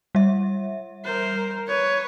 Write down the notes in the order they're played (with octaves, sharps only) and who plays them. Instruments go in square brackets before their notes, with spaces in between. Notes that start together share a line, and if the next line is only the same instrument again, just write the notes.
[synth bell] G3 E5
[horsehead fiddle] A#4 C5
B4 C#5